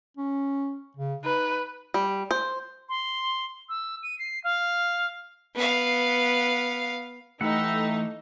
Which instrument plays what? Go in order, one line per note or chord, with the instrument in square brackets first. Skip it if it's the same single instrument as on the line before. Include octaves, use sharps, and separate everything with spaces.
[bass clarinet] C#4
C#3
[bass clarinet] D#4 [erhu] B4
[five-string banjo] G3
C5
[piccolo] C6
E6
D#7
C7
F5
[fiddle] B3 F5
[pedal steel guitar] E3 F#5 [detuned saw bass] A3 [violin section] D#4 [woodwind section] G4 B5 E6